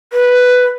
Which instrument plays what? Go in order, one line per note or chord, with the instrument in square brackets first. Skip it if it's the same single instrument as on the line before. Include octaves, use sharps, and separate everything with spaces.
[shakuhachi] B4